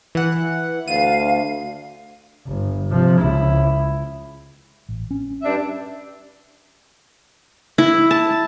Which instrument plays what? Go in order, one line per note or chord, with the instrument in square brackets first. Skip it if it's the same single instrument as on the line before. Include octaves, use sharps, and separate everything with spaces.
[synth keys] E3 F#5
[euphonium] D2 [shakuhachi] F5 [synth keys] D#7
[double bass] G1
C3 F3
C#2 E4
[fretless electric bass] A1
C#4
[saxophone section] G2 D4 E5
[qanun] E4
A5